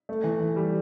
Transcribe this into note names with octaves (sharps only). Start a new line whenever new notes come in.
A3
E3
E3
G3